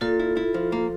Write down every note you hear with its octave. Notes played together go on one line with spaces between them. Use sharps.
A#2 F4 A4
E4
E4
F3
A#3